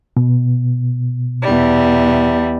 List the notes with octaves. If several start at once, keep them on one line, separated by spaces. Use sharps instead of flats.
B2
E2 G3